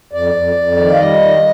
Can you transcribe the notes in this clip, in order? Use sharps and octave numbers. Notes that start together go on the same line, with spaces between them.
F2 D5
F2
F2
D#3
F5
G3 D#5
D#3